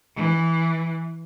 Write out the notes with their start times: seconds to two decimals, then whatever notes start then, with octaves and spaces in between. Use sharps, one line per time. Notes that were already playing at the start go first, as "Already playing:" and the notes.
0.15 E3